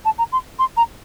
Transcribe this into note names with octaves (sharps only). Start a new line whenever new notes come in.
A5
A#5
C6
C6
A#5